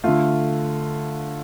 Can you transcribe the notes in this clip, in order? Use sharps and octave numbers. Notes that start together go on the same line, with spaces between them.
D3 A3 F4